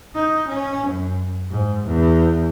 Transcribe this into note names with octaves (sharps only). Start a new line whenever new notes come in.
D#4
C#4
F#2
G#2
E2